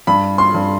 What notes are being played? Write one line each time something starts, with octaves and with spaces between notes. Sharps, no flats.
G2 B5
C6
G2